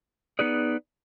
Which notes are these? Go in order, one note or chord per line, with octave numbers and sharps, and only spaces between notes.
B3 D#4 G#4 B4 D5